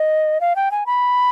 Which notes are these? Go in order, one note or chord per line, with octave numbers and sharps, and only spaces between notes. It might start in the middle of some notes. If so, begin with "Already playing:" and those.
Already playing: D#5
F5
G5
G#5
B5